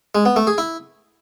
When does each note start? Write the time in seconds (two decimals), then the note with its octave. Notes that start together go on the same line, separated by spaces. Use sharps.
0.15 G#3
0.25 B3
0.36 A3
0.47 G#4
0.58 E4